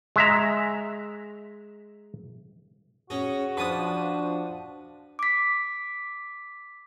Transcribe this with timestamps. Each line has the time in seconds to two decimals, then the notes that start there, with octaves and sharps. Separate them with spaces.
0.16 G#3 E5 A#5
3.10 C#4 F#4 G#4 A#6
3.57 F3 D4 B4 G#5 D#6
5.19 D6 B6